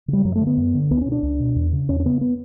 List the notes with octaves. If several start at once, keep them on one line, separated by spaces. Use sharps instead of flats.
C#3 G3
F#2 F#3
A3
D3
B3
F#2
D3
C#2 B3
D4
C#4
B2
D4
C#2
B2
E2
C#3
E2 C#4
C#4
C#3 B3
B3